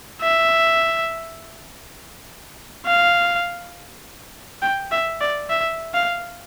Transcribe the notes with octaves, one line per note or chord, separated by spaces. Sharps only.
E5
F5
G5
E5
D5
E5
F5